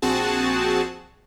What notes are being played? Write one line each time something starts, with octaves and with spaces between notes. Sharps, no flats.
A#1 C4 F#4 G#4 A5